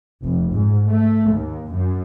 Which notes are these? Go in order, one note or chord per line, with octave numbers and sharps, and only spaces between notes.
F1
G#2
A3
D#2
F#2